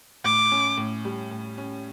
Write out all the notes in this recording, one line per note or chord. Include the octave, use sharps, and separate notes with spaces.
A2 D6
C#4
A2
G3
A2
C#4